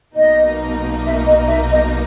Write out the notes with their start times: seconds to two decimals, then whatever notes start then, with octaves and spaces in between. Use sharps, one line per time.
0.15 B1 B2 A#3 D#4 D#5
1.04 E5
1.26 D#5
1.48 E5
1.71 D#5